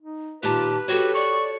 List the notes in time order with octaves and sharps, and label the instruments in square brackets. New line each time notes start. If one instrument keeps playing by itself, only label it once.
[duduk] D#4
[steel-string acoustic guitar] D#2 A#2 A5 [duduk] F4 [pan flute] G4 [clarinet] B4
[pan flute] F#4 [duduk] G4 [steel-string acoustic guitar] A4 C#5
[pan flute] D5 [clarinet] C#6